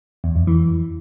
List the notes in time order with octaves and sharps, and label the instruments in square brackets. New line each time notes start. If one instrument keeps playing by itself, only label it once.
[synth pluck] E2
F2
E3